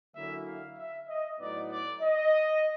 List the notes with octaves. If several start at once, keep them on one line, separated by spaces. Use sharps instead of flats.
D3 F#3 A#3 C#4 E4 E5
F5
E5
D#5
A2 F#3 B3 D#4 D5
D5
D#5